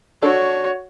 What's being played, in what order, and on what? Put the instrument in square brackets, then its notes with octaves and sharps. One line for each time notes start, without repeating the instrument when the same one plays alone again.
[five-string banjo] D4 A4 [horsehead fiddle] F#4 C#5